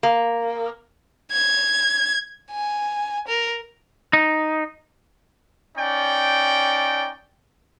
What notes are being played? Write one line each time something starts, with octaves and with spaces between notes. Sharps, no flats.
A#3
G#6
G#5
A#4
D#4
C#4 D#4 D5 G5